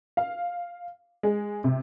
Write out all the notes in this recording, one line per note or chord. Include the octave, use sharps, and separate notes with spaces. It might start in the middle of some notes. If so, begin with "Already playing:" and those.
F5
G#3
C3